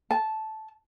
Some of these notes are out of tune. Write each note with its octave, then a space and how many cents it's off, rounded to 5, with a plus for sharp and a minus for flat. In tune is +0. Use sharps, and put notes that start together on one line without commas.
A5 -10